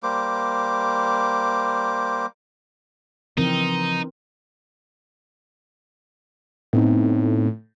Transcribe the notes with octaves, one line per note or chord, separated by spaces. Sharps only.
G3 A#3 C5 D6
C#3 E3 F3 C4 D#4 A#4
A2 B3 C4 D#4